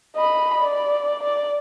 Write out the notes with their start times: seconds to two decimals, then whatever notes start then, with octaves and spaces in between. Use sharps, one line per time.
0.16 D#5 B5
0.61 D5
1.23 D5